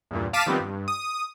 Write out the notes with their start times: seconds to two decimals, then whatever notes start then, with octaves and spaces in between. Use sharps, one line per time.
0.11 E2 G2 A#2
0.33 F5 A5 D6 B6 D#7 E7
0.46 D#3 F3 G3 B3 C4
0.60 G2
0.88 D#6